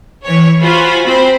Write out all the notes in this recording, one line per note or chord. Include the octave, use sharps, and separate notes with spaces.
E3 C#5
F4 F#4 C5 G#5 B5
C4 C5 B5